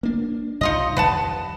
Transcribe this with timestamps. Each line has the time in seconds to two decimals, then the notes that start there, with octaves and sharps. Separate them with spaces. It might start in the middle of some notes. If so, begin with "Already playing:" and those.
0.03 A#3 D4
0.61 C2 G2 C3 D#4 F4 D#5
0.97 F2 D#3 G3 B4 F#5 A5